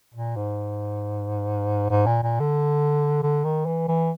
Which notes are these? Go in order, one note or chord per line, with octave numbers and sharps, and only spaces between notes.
A#2
G#2
G#2
A#2
A#2
D3
D3
D#3
E3
E3